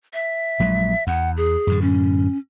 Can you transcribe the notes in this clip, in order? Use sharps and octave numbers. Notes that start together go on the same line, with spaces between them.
E5
A#1 F#3 G#3
E2 F#5
G#4
F#2 A2 D3
C#4